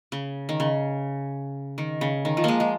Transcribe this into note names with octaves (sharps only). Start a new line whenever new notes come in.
C#3
D#3
C#3
D#3
C#3
D#3
F3
G#3 A#3
G#3